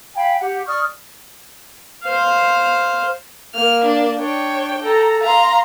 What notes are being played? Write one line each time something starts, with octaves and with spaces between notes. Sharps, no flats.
F5 G5 G#5 B5
G4 F#5
D5 C#6 D#6 F6
C5 F5
A#3 F6
D4
D4 C#5 G5
A4 A#5
F5 A#5 C6